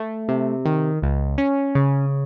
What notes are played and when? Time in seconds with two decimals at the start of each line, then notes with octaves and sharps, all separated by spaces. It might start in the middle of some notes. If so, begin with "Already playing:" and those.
Already playing: A3
0.29 C3
0.65 D#3
1.02 C#2
1.38 C#4
1.75 C#3